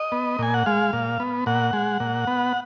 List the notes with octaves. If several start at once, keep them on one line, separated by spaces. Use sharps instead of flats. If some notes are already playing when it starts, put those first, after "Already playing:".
Already playing: D#5
B3
A#2 G#5
F#5
G#3 F5
A#2
B3
A#2 F#5
G#3
A#2
B3